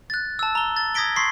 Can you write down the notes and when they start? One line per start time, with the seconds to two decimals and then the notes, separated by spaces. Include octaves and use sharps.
0.10 F#6 A6
0.39 A5 E6
0.55 A#5 G7
0.77 A6
0.94 D#6 G#6 A#6 B6 D7 G7
1.16 C6 C#6 D#6 B6 C7